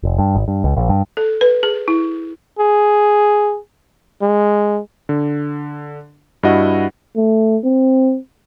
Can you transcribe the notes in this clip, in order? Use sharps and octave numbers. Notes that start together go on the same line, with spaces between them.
F1
G2
G#1
G2
C#2
A#1
G2
A4
B4
G#4
E4
G#4
G#3
D3
G2 E4 F#4 D#5 F#5
A3
C4